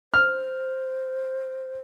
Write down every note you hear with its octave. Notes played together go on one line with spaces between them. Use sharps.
C5 F6